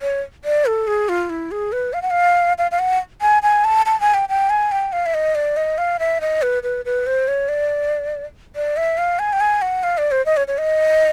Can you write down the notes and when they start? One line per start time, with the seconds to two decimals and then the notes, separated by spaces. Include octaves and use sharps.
0.02 C#5
0.45 D5
0.66 A4
0.87 G#4
1.09 F4
1.30 E4
1.51 G#4
1.72 B4
1.93 F5
2.02 F#5
2.11 F5
2.58 F5
2.71 F5
2.79 F#5
3.21 G#5
3.43 G#5
3.64 A5
3.86 A5
4.00 G#5
4.14 G5
4.29 G5
4.50 G#5
4.72 G5
4.93 F5
5.06 E5
5.14 D#5
5.35 D5
5.57 D#5
5.78 F5
5.99 E5
6.21 D#5
6.42 B4
6.63 B4
6.85 B4
7.06 C5
7.28 C#5
7.49 D5
8.56 D5
8.77 E5
8.98 F5
9.19 G#5
9.33 G5
9.40 G#5
9.62 F#5
9.83 F5
9.98 D5
10.11 C5
10.26 D#5
10.37 C#5
10.48 C#5
10.58 D#5